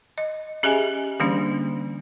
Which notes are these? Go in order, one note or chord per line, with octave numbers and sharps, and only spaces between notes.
D#5
C#4 G4 G#4 D#5 E5 G#5
D3 E3 G3 A#3 C#4 D4